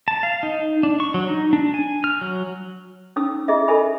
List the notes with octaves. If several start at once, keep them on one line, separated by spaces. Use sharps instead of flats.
A5
F5
D#4
D4
C#6
F#3
D#4
D4
G#5
F6
F#3
C#4 D#4 D#6 E6
E4 G#4 D#5 E5
A4 A#4 D#5 E5 G#5 B5